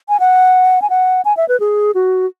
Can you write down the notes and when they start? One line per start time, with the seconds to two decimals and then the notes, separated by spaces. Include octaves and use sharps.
0.09 G#5
0.20 F#5
0.82 G#5
0.90 F#5
1.25 G#5
1.37 E5
1.49 B4
1.60 G#4
1.95 F#4